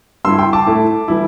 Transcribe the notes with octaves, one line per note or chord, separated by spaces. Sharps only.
G2 G3 E4 C6 E6
G5 C6
A5 D6
A2 A3 E4
E3 G3 E4